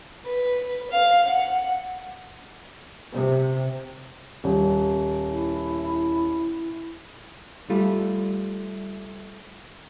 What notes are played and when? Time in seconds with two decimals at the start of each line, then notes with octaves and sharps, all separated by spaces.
0.25 B4
0.90 F5
1.27 F#5
3.12 C3
4.44 D#1
5.30 E4
7.70 G3 A3 F4